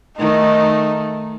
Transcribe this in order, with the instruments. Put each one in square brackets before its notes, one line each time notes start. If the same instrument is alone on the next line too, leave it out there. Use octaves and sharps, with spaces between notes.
[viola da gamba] D#3 A3 [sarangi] D#4